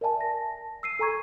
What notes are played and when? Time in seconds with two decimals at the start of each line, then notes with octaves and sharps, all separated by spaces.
0.01 A#4 D5 E5 G#5 A5
0.21 A#6
0.83 E6 C7 D#7
0.99 A4 G#5 A#5 C#6 G#6